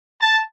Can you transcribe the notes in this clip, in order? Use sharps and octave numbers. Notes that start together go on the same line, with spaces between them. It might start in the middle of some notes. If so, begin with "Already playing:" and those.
A5